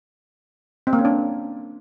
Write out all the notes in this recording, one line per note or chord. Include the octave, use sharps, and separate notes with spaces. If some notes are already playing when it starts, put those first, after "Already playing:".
C4
A#3
C#4
D4